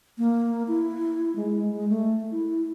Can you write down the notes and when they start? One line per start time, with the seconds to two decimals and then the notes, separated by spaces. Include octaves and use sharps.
0.18 A#3
0.68 E4
1.36 G#3
1.72 G#3
1.89 A3
2.31 E4